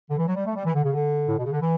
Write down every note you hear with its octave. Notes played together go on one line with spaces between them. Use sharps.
D3
E3
F#3
G3
A3
G3
E3
D3
C#3
D3
A2
B2
C#3
D3
E3